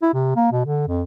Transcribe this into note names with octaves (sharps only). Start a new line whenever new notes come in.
E4
C3
A#3
B2
D3
F2